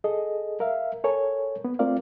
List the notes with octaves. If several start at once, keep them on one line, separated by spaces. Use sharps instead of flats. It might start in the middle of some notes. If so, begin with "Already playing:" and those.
G#4 A4 D#5
A#4 E5 F5
A4 A#4 C#5 G#5
B3
A3 C4 F4 A#4 D5 F5